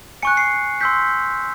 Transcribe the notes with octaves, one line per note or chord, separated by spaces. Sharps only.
G#5 C#6 F#6 C#7
C7
C6 E6 G6 B6